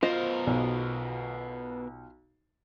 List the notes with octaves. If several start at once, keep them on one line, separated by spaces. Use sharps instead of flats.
B2 F4 A#4 C5 D#5
B1